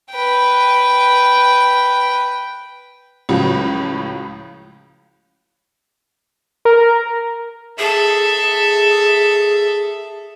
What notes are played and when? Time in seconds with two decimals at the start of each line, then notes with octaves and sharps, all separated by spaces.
0.12 B4 G5
3.29 C#2 A2 C#3 F3 F#3
6.65 A#4
7.79 G#4 A4 E5